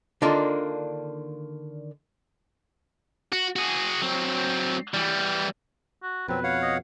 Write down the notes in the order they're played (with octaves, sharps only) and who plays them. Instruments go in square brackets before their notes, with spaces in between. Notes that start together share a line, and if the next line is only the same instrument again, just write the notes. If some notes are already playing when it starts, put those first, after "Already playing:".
[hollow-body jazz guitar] D3 D#3 A#3 D4 F4
[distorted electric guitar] F#4
F#4 G#4
F#3 C4
E3 G3
[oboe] F#4
[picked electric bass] F2 B2 [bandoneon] F#3 C4 [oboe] B4
[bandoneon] C#5 F5 F#5
[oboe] D#5